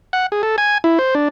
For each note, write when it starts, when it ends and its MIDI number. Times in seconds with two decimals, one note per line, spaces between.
0.13 0.26 78
0.32 0.42 68
0.43 0.56 69
0.58 0.78 80
0.84 0.99 64
0.99 1.14 72
1.15 1.28 62